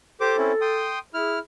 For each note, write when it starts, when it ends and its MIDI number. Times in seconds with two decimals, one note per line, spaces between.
0.21 0.36 67
0.21 0.98 69
0.21 0.36 72
0.21 0.36 86
0.37 0.52 60
0.37 0.52 61
0.37 0.52 64
0.61 0.99 79
0.61 0.99 84
0.61 0.99 87
1.14 1.39 64
1.14 1.38 68
1.14 1.39 89